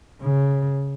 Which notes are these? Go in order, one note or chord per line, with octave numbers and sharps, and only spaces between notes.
C#3